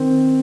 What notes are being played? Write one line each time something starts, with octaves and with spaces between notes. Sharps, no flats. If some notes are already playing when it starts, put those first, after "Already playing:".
Already playing: D#3 C4